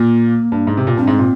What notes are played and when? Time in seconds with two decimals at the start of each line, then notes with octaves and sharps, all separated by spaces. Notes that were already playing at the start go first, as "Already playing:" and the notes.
Already playing: A#2 A#3
0.52 G2
0.67 G#2
0.77 C3
0.87 A#2
0.97 G2 C4
1.07 G#2
1.19 A#2